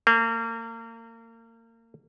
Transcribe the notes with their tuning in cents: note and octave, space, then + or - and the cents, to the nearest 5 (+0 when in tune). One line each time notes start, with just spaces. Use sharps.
A#3 -35